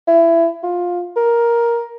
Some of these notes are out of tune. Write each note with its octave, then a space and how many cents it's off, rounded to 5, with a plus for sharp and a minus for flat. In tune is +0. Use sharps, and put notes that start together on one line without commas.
E4 +20
F4 +15
A#4 +10